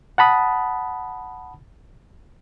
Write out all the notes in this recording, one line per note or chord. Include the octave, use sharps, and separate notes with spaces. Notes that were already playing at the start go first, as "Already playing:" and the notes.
F#5 A5 B5 D#6